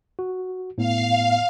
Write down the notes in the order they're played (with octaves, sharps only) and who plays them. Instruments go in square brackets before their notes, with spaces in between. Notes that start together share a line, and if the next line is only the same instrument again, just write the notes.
[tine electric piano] F#4
[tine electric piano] A2 B3 [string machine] F5